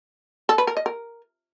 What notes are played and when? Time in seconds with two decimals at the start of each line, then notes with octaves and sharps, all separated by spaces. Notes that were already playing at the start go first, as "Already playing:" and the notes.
0.49 A4
0.58 B4
0.67 A#4
0.77 D#5
0.86 A#4